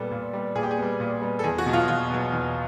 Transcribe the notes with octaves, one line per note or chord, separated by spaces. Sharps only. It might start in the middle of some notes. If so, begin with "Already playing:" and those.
Already playing: A#2 G3 B3 A4
A#2
G3 B3
A#2 G#4
G4
G#4
G3 B3
A#2
G3 B3
A4
E2 G#4
F#4
B2 F#3
F4
E2 F4
B2 F#3
E2